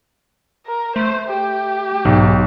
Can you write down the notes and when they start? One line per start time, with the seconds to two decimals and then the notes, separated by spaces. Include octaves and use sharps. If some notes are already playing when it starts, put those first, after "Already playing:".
0.67 A#4
0.96 A3 C5
1.29 G4
2.05 B1 G#2